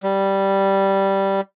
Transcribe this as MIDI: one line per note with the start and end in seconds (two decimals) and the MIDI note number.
0.03 1.41 55